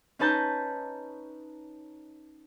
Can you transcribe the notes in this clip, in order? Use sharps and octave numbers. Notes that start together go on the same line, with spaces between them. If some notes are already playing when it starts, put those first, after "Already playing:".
C#4 D#4 B4 A5 A#5 G6